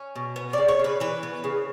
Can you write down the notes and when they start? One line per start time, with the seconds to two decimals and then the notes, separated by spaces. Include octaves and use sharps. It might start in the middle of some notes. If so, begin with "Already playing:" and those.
Already playing: C#4
0.16 B2
0.36 B3
0.53 C#3 D5
0.68 C#5
0.79 C#3 B4
1.00 E3 B4
1.23 B3
1.44 C#3